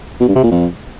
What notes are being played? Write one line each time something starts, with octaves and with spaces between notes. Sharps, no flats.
B2
G2
C3
A#2
F2